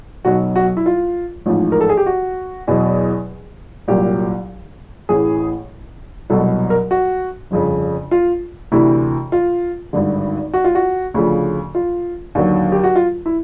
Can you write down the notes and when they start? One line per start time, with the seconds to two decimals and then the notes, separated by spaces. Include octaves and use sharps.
0.25 B1 B2 F#3 F#4
0.56 F#4
0.77 E4
0.86 F4
1.46 A1 G#2 F3
1.72 A#4
1.81 A4
1.89 G#4
1.97 G4
2.06 F#4
2.67 E2 B2 F#3
3.88 C2 A#2 F#3 G4
5.09 A1 A2 E3 G#4
6.30 C2 B2 F#3 A4
6.70 A#4
6.91 F#4
7.51 G1 F2 C#3
8.11 F4
8.72 D2 C3 E3 E4
9.32 F4
9.93 G#1 G2 D3
10.54 F#4
10.64 F4
10.75 F#4
11.14 D2 C#3 F3
11.75 F4
12.35 D#2 D3 F#3
12.72 G4
12.84 F#4
12.96 F4
13.26 E4